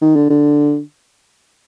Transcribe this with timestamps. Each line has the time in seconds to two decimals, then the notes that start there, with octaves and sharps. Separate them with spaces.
0.02 D#3
0.16 D3
0.30 D3